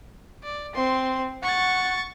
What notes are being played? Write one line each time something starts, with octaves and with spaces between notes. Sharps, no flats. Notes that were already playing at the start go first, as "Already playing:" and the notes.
D5
C4 C6
F#5 C#6 A6